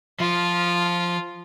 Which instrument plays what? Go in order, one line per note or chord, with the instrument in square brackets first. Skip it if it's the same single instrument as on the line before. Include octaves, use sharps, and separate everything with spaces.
[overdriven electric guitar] F3 [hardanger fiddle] F4